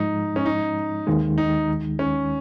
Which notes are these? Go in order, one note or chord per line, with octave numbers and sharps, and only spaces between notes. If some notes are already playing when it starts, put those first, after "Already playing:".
Already playing: G#2 F3 G#3 D#4
C#4
D#4
D#2 D#3 G#3
D#4
C#4